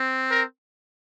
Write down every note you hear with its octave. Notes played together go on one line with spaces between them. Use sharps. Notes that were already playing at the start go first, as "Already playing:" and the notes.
Already playing: C4
A#4